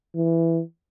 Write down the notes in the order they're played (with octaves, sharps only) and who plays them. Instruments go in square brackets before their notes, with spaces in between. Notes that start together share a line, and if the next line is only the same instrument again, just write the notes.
[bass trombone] E3